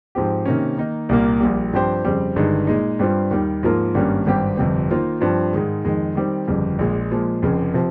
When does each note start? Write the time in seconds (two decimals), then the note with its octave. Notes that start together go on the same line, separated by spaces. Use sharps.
0.15 G#2 F3 C4 G4
0.45 C3 D#3 A#3 C#4
0.78 D#3 A#3 D#4
1.09 C2 A#2 G3 A#3
1.40 A#1 A#2 G3
1.73 G2 F3 C4 G4 C5
2.05 F2 C#3 G3 C4
2.35 G1 G2 D#3 G#3 D#4
2.67 A#2 G#3 D#4
2.99 G2 G3 C4 F4 C5
3.30 D#2 D#3 G3
3.63 G#2 F3 A#3 F4 A#4
3.94 G#1 G2 G3 A#3 C#4
4.26 G#1 G2 G3 C4 G4
4.57 G1 F2 C3 G3 C4
4.89 D#3 A#3 F4 C5
5.21 G2 F3 C4 F4
5.53 G#2 D#3 G#3
5.84 F2 D#3 G#3
6.15 D#3 G3 C4
6.47 G1 F2 C#3 G3
6.79 A#1 A#2 G#3
7.11 A#2 F3 G#3
7.43 F1 F2 C#3
7.74 C3 F3